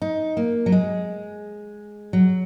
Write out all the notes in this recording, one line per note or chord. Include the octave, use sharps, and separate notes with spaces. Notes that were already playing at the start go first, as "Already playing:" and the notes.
D#4
A#3
F#3
G#3
F#3